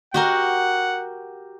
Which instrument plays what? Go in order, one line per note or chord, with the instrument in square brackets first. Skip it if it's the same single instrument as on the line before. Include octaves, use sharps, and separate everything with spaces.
[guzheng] F#4 G4 A#4 [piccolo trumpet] F#5